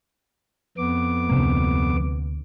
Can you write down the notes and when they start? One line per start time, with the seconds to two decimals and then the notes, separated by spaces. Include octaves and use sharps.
0.78 F2 B3 D6
1.29 D2 C3 A#3